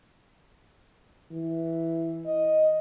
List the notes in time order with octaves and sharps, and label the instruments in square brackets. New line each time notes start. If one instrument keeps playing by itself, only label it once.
[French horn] E3
D#5